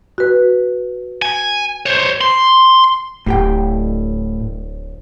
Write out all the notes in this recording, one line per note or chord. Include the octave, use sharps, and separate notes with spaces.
F#4 B4
G#5
C5 C#5
C6
D1 A2 G4 G5